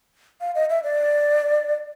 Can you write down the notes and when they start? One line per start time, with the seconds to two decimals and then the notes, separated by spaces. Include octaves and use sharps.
0.41 F5
0.55 D#5
0.70 E5
0.84 D5